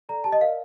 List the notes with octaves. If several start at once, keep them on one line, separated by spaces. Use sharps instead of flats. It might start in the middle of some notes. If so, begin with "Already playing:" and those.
A4 D5 A#5
G4 A5
D#5
A#4 D5 F5